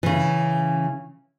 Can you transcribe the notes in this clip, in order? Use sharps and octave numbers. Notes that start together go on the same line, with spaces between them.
C#3 E3